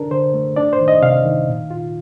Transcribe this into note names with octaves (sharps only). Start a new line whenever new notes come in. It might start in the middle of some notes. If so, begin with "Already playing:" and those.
Already playing: D3 D4 A4 A#4
D3 C5
A3
D4 D5
C5
D#3
D#5
C3 F5
D#3
A#2
F4